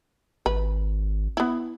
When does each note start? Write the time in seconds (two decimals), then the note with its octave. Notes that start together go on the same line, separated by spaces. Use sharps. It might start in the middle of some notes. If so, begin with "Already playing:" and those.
0.46 G#1 B4
1.37 B3 E4